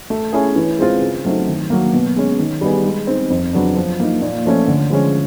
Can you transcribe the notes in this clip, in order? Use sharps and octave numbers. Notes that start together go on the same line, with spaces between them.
A3
C#4 E4 G#4
E3
G#3 C4 F4
C#3
F#3 A3 C4 D#4
D#3
F#3 A#3
B2
G#3 C#4
D#3
G3 B3 D#4 G#4
G#3
C4 D#4
F2
C#3 F#3 B3 D4
F3
A#3 D#4
A#2
F3 A3 C#4
D3
F3 G#3 C#4